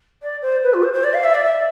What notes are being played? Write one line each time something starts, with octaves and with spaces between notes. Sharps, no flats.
D5
C5
B4
F4
C5
C5
D5
F5
E5
D5
E5